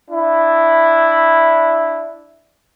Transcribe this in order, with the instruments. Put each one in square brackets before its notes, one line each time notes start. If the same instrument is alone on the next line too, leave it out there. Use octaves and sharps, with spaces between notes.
[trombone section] D4 E4